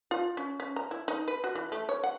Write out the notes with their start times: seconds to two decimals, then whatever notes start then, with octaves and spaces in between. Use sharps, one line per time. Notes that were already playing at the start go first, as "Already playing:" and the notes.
0.11 F4
0.37 C#4
0.60 C#4
0.76 A#5
0.91 E4
1.08 D#4
1.28 B4
1.44 F#4
1.55 E3
1.72 A3
1.89 C#5
2.04 F#5